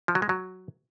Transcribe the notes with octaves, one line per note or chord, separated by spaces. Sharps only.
F3
F#3
G#3
F#3